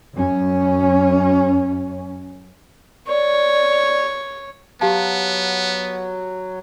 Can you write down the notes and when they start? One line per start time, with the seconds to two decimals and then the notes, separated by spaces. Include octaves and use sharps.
0.15 F#2 C#4
3.08 C#5 D5
4.81 F#3 B3 G4 F5 A5